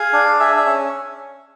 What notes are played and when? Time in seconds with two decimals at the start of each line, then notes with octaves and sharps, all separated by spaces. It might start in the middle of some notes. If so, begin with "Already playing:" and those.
Already playing: G#4 F5
0.13 D4
0.40 G#4 E5
0.57 E5
0.66 C#4